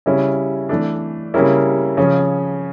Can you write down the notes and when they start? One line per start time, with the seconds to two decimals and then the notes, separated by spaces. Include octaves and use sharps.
0.06 C#3 G3 C#4 E4
0.69 E3 A3 D4
1.34 C#3 G3 A#3 C#4 E4
1.97 C#3 F3 C#4